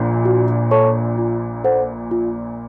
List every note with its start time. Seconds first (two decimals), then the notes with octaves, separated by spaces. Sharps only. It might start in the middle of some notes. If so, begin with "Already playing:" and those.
Already playing: A#1 A#2
0.25 F#4
0.71 A4 C#5 A5 C#6
1.18 F4
1.64 A4 C5 F#5
2.11 F4